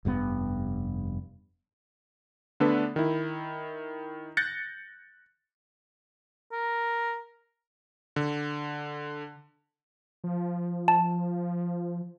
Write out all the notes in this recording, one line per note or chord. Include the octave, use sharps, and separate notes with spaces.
F1 G2 B2 B3
D3 A3 B3 D4 A4 B4
D#3 E4
F#6 G6 A6 A#6 C#7
A#4
D3
F3
A5